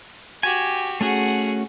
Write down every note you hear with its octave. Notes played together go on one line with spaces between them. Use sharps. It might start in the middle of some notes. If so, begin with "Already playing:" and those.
F#4 G4 G#5
A3 C#4 F#4 G#4 F#5